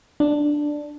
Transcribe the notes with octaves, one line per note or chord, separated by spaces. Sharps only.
D4